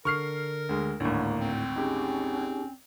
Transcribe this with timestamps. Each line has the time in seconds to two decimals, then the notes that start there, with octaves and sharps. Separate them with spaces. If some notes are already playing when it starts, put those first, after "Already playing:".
0.05 D3 A#4 C#6 F6 C7
0.69 D2 G#3
1.00 G#1 D2 A2 A#3
1.40 C4
1.76 C#4 D#4 G4 G#4